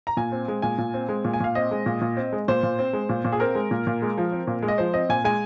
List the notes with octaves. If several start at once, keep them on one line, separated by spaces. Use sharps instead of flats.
A#5
A#2 G#5
C4
G#3
A#2 G#5
A#2
C4
G#3
A#2
G#5
A#2 F5
C4 D#5
G#3
A#2
A#2
C4
G#3
A#2 C5
A#2
C4
G#3
A#2
A#2
G#4
C4 A#4
G#3
A#2
A#2
G#3
F3
C4
A#2
G#3
D#5
F3 C5
C4 D#5
A#2 G#5
G#3 G#5